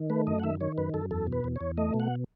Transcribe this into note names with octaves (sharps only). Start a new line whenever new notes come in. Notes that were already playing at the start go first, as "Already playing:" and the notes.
Already playing: D#3
A3 B4
F#2 D#5
F#5
D#3 E5
D#3 C#5
F#2 B4
F#2 A4
E2 A4
B2
B4
E2
E2 C#5
A3 D#5
B2
F#5